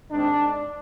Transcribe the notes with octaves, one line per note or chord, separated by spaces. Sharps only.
G#2 D#3 G#3 C4 D4